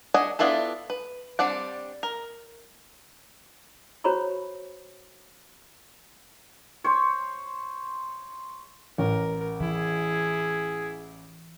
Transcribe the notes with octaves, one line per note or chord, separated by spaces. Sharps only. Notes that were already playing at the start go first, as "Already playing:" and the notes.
D4 D#5 F#5 G#5
B3 D4 E4 F4 A4
B4
G3 C4 D4 D5 F#5
A#4
F#4 C5 C#5 A#5 B5 C#6
C5 C#5
A1 A#4
E3 E4 G#4